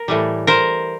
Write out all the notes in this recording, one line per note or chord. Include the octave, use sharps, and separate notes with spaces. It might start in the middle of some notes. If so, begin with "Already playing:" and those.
Already playing: A#4
A2 E3 G3
A#4 C5